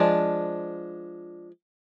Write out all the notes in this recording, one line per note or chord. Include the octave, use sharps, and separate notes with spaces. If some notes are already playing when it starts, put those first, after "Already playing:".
Already playing: F3 G#3 D4